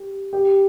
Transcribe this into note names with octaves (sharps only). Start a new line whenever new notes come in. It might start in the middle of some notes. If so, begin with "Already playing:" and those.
Already playing: G4
G4